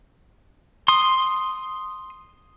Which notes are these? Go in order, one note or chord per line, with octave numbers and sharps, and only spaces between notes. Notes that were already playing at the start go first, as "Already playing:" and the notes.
C6 D#6